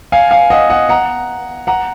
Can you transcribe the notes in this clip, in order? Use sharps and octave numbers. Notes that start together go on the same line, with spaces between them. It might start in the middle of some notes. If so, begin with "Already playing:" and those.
F5 G#5
F5 G#5
D#5 F#5
D#5 F#5
F#5 A#5
F#5 A#5